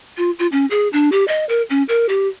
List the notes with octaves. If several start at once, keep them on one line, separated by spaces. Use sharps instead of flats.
F4
F4
C#4
G#4
D4
G4
D#5
A#4
C#4
A#4
G4